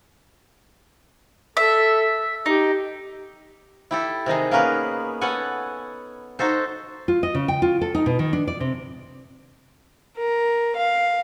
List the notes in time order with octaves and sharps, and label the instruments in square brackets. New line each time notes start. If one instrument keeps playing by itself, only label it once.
[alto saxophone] A4 [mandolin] E5
[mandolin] D#4 [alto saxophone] G4
[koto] E4 G4 A4
C3 D#3 D#4 G#4
A#3 B3 C#4 A#4 B4
B3 C#4 A4 F#5 G#5
D#4 F#4 A4 C5
[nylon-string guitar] F4
D#5
C#3
G5
F4
A4
D#4
B2
D#3
D4
D5
C3
[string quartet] A#4
F5